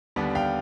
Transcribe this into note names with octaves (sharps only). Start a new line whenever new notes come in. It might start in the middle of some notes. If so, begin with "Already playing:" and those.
D#2 D3 G3 B3 D4
F5 G5